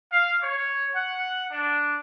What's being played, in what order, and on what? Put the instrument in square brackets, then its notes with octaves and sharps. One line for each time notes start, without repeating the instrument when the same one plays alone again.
[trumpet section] F5
C#5
F#5
D4